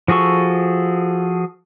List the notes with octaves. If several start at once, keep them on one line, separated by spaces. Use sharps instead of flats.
F3 F#4 G#4 A4 C#6